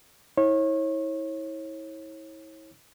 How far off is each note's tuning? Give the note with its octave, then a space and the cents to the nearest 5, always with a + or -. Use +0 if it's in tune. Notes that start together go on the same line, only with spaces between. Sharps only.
E4 -35 C#5 -30